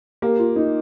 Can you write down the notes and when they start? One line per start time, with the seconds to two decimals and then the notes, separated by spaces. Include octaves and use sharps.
0.22 A#3 G4
0.39 F4
0.56 D#4